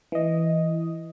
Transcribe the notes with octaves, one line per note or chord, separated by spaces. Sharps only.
E3 D#5